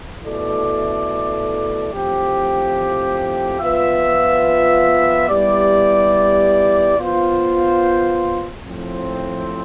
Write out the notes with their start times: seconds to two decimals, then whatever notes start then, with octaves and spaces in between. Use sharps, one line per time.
0.22 B2 A3 E4 A4 D5
1.90 A2 F3 C4 G4
3.59 F3 B3 F4 B4 E5
5.28 G3 B3 E4 G4 D5
6.97 B3 F4 C5
8.66 A2 F3 C4